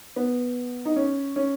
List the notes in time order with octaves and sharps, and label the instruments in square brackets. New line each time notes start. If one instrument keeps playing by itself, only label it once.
[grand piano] B3
D#4
C#4
C#4